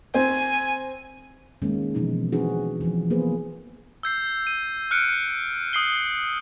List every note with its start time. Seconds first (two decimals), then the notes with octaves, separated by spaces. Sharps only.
0.14 C4 G#5
1.62 D#3 G#3 A#3 C4 C#4
1.95 B2 E3 F3 D#4
2.32 C4 D4 D#4 F#4 G#4 B4
2.81 E3 F3
3.10 E3 A#3 B3 G#4 B4 C5
4.03 E6 G6 C7
4.47 D#7
4.91 F6 F#6 C#7 D7
5.73 D#6 C7 G7